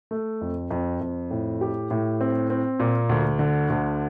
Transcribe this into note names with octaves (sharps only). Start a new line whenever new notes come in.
A3
F2
F2
F2
A2
G4
A2
C4
C4
A#2
D2
D3
D2